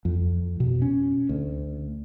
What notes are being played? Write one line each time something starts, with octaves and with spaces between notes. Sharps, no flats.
F2
B2
C#4
D2